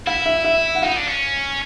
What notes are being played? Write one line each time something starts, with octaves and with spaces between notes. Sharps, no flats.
E4 F5
E5
E5
F#5
D#4 F5
D4
C#4